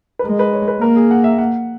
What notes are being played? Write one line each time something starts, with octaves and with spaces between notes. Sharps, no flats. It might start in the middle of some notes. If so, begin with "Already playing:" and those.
B4
G#3 A#4
B4
C#5
B4
A#3 A#4
G#4
F#5
E5
F#5